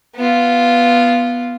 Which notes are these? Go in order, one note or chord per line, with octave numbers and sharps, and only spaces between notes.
B3 F4